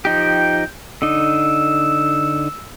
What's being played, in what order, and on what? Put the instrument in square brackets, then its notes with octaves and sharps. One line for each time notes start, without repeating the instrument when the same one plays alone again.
[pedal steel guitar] F3 D#4 G4 [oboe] G5
[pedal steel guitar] D3 D#4 [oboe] E6